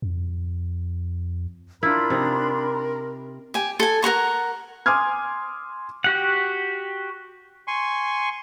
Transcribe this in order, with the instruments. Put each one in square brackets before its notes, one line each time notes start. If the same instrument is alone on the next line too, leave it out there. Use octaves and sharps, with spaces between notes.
[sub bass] F2
[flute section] D4 B5 C6 [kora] E4 F4 [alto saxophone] A#4
[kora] C3 D#4
[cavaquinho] G4 G#5
A4 G#5
A#4 F#5 A#5 C#6
[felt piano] G#5 C6 D6 D#6 F6 G#6
[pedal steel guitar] F#4 G4 F#5
[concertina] G#5 C6 C#6